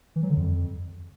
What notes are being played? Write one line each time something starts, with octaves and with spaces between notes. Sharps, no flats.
E3
F#3
D3
F2